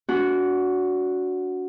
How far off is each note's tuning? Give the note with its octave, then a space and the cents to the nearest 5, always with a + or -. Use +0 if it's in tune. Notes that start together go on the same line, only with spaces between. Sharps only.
D4 -40 F#4 -5